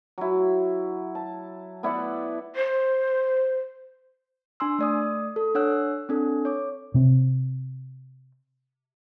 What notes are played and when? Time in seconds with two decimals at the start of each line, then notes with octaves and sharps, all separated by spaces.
0.18 F#3 E4
1.15 A5
1.83 B3 E4 D5 F#5
2.56 C5
4.60 D4 G#5 C6 E6
4.79 A3 D5 D#6
5.36 A4
5.55 D4 C#5 F#5 E6 F#6
6.09 C4 D4 A4
6.45 C#5 D6
6.94 C3 C4